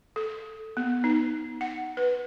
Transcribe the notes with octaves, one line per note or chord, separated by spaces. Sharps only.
A4
B3
D#4
F#5
B4